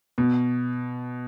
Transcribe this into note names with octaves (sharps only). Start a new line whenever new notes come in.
B2